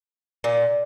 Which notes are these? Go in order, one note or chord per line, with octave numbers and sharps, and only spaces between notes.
A#2